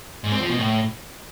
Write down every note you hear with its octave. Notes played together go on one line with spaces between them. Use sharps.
G#2
C4
F3
B2
A2